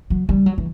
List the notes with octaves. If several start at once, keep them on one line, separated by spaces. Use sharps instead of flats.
F#3
G3
F#3
E3